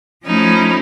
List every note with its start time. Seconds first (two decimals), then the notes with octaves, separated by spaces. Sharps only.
0.25 F3 A3 C#4 D#4 E4